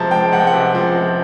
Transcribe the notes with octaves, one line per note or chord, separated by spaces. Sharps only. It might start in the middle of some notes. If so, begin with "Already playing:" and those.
Already playing: C#2 C3 F3 A5 A#5
G#3 G5
C#2 F#5
G5
F#5
C3
F3
G#3